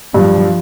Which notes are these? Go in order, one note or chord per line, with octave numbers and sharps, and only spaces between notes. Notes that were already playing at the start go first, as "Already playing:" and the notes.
G2 F3